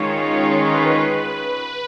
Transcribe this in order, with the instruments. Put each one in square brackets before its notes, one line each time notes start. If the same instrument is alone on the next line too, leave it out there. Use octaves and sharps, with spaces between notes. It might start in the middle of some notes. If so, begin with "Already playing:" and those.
Already playing: [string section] D#3 G#3 C#4 F4 [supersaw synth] C#5
[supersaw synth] B4